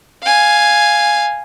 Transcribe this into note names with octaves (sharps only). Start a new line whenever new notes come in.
F5 G#5